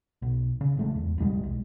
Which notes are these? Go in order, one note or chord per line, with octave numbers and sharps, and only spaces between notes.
B1
C#3
A1 G#3 A3
E2
D#1 C2 G3 G#3
B1